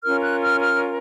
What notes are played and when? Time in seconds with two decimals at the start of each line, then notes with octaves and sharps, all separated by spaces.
0.04 C#4 F4 A#4 F6
0.22 F#6
0.42 F6
0.61 F6